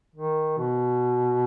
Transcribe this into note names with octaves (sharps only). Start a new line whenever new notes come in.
D#3
B2